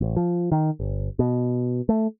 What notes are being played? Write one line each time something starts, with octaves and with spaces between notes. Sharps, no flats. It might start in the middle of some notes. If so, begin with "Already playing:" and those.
A1
F3
D#3
G1
B2
A3